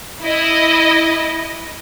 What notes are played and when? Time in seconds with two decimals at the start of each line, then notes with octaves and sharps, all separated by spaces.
0.23 E4 D#5